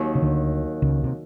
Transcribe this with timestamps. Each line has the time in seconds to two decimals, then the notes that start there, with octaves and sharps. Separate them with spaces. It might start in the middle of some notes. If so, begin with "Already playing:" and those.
Already playing: D#2 D#3 F#3
0.15 C#3
0.22 D2 D3
0.82 C#2 C#3
1.04 C3